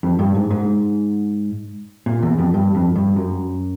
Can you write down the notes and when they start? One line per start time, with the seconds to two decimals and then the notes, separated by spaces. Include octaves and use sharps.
0.03 F2
0.19 G2
0.34 G#2
0.51 G#2
2.06 A#2
2.22 E2
2.39 F2
2.54 G2
2.75 F2
2.96 G2
3.16 F#2